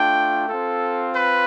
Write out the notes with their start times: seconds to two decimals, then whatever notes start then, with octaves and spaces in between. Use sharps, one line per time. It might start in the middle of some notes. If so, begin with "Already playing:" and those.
Already playing: A3 D4 F4 G5
0.49 C4 F4 A4
1.14 B4